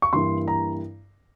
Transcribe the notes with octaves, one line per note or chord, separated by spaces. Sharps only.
C#6
G2 E3 A#3 E4 C6
A#5